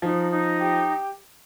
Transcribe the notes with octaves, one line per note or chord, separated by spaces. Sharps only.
F3 D#4
D#4
G4